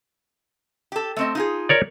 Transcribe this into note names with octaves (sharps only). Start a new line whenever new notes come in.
G4 A4
A3 C4 D#5
D#4 F4 G#4
A#4 C#5 D5